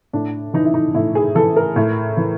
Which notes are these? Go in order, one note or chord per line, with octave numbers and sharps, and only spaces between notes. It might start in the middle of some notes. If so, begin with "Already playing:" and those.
A2 D4
E3 D#4
E4
D#4
A2 E4
G#4
E3 A4
A#4
A2
E3